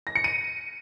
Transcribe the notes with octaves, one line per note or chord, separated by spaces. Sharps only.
A#6
C#7
D#7